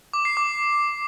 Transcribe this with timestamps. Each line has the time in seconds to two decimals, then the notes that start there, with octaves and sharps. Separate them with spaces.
0.13 D6
0.25 C7
0.37 D6